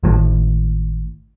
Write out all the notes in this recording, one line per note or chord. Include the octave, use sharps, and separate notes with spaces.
G#1 A2